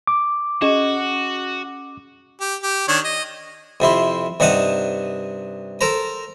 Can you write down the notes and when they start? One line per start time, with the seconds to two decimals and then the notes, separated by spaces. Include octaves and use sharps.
0.07 D6
0.62 C#4 F#4 G#4 D#5
2.41 G4
2.63 G4
2.88 D#3 D4 C#5
3.05 D#5
3.80 F2 C3 E4 C6
4.40 G2 C3 D#4 F#5 A5 D#6
5.81 A4 A#4 C5 A#5